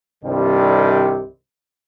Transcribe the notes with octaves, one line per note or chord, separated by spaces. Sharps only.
C2 G2 C3 D#3 G3